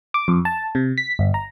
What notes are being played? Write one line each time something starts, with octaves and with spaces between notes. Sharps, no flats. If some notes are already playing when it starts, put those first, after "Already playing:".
D6
F2
A5
C3
B6
G1
A#5